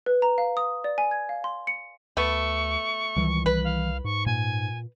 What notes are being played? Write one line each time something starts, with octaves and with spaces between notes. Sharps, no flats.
B4
A#5
F5
D#6
D5
G#5
G#6
F5
C6
C#7
D2 A3 B3 C#6
C#2 D#3 E3 G3
C2 B4 F#6
F5
G#2 C#6
A#2 G#5